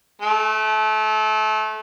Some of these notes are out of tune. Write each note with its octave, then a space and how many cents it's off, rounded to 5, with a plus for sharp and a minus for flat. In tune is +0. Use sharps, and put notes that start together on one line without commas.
A3 -30